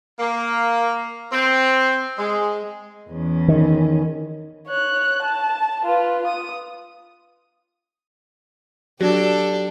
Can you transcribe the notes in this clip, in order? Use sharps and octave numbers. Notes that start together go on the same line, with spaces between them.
A#3
C4
G#3
E2 C#4
D#3
C#5 F#6
A5
F4 B4
D#6
F#3 D4 G4 A4